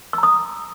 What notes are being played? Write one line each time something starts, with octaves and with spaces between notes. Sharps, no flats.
A#5 D#6 E6